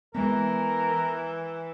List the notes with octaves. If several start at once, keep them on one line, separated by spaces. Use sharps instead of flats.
E3 G#3 B3 A#4